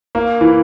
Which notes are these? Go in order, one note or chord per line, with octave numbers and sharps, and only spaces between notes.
A#3
E3